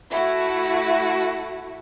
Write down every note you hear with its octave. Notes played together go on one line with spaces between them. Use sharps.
A3 E4 F#4